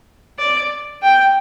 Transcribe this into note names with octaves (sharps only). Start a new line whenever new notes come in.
D5
G5